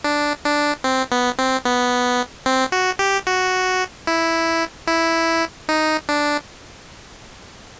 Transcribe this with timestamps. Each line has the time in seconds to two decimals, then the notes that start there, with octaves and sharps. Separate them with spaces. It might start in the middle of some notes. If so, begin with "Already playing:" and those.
0.04 D4
0.44 D4
0.84 C4
1.12 B3
1.39 C4
1.65 B3
2.46 C4
2.72 F#4
2.99 G4
3.27 F#4
4.07 E4
4.87 E4
5.69 D#4
6.09 D4